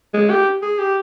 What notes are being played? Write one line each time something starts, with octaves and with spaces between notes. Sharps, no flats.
G#3
G4
G#4
G4